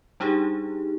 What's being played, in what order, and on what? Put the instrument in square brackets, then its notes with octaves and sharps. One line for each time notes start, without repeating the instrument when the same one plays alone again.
[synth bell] G3 D4 D#4 G4 G#4